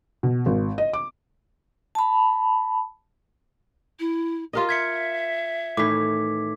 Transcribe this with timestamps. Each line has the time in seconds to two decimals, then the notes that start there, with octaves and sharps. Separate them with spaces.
0.23 B2
0.46 G#1
0.78 D#5
0.93 D6
1.95 A5 B5
3.99 E4
4.53 F4 G4 A#4 D#5
4.69 E5 G#6 B6 C#7
5.77 A2 D#3 E3 D6 B6